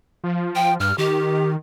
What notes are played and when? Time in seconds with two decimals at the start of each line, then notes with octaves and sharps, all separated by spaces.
0.24 F3
0.55 G5
0.80 G2 F6
0.98 D#3 G4